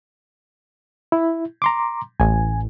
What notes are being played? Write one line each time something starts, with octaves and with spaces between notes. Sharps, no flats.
E4
A#5 C6 D6
A1 G#5